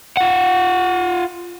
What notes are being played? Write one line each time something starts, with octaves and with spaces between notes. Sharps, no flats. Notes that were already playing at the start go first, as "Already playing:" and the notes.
F4 F#5